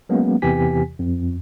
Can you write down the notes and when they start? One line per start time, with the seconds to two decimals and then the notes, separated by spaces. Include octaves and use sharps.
0.09 F#3 G#3 A#3 B3 C#4
0.42 E2 C3 E3 G4 G#5 B6
0.99 F2